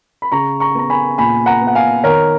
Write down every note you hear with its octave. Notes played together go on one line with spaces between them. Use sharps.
B5
C#3 A#5 C#6
A#5 C#6
B3 A#5
G#5 B5
A#2 G#5 B5
F#5 A#5
B3
F#5
F5 G#5
D#3 A#4 C#5